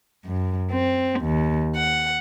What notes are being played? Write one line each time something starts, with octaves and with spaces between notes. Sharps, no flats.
F#2
C4
D#2
F#5